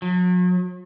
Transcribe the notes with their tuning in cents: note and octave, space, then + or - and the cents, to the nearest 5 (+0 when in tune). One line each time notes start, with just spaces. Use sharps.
F#3 -45